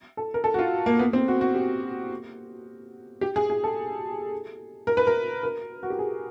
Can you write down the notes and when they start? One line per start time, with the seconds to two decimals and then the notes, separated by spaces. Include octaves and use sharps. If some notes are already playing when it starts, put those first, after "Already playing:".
0.17 A4
0.34 A#4
0.44 A4
0.54 F#4
0.59 F4
0.86 A#3
0.99 B3
1.13 C4
1.28 F#4
1.41 F#4
1.55 G4
3.21 G4
3.36 G#4
3.50 G#4
3.64 A4
4.87 A#4
4.97 B4
5.07 A#4
5.43 A#4
5.83 F#4
5.90 G4
5.99 G#4